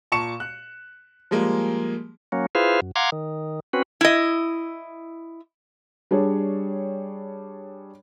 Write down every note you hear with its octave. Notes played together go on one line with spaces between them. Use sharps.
A#2 A5 C#6 C#7 E7
F#6
F3 G3 G#3 A#3
F#3 A#3 C#4
E4 F4 G#4 B4 C5 F5
F#2
F5 F#5 A#5 C6 D6 G#6
D#3
C4 C#4 F#4 B4
E4 D#5
G3 D4 G#4 C#5